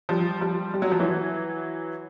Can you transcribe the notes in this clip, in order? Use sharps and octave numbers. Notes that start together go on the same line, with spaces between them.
F3 G3
F3 G3
G3
F#3
F3
E3 F#3